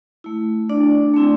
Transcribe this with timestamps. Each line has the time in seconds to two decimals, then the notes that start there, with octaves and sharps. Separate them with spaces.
0.24 A3 E4
0.69 D4 D5
1.14 A3 C4 E4